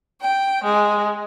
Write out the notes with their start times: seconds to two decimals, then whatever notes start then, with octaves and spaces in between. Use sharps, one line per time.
0.20 G5
0.64 G#3